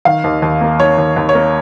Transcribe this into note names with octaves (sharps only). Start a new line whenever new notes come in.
D#3 F5
D#2
D#2
A#3
D#3 C#5
D#2
D#2
C#5
A#3